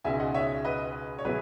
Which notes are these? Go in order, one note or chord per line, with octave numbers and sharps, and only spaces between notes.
C#2 B2 G#3 D#4 E5 G#5
D#5 F#5
C#5 E5
B4 D#5
C#5
B2 F#3 B3 E4 G#4 B4